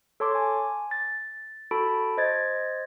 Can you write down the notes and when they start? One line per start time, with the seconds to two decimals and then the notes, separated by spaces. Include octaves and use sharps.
0.20 A4 C#5 A5 C6 D6
0.35 G#5
0.91 A6
1.71 F#4 A4 A5 B5 D7
2.18 C5 D#5 G#6 A6